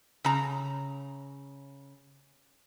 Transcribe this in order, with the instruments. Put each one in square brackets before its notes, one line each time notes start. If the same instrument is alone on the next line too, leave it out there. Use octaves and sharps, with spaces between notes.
[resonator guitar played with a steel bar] C#3 A#5